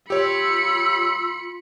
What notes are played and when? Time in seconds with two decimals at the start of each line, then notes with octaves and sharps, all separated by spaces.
0.10 F4 G4 C#5 B5 E6 C#7